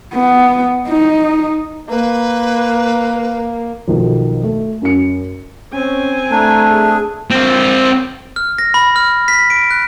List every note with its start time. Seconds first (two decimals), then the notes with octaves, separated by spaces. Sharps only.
0.14 B3
0.88 D#4
1.89 A#3 B4
3.88 B1 B2 D#3 F3
4.43 A3
4.82 F#2 C#4 C#7
5.73 C4 C#4 G#5
6.31 A3 D4 A#5
6.70 G#4
7.31 C4 A#4
8.36 F6
8.58 A#6
8.74 B5
8.96 F6
9.28 B6
9.50 D7
9.71 F#6